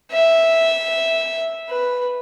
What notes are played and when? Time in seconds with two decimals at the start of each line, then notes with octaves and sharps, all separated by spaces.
0.12 E5
1.70 B4